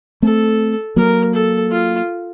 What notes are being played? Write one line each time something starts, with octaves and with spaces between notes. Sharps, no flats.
A3 C4 A4
F#3 A#3 A#4
A4
F4